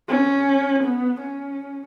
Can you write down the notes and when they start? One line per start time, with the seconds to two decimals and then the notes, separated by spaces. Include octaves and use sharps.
0.09 C#4
0.84 B3
1.21 C#4